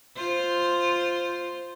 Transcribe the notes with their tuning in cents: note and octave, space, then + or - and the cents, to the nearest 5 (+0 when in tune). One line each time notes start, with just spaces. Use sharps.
F4 +0 C5 +0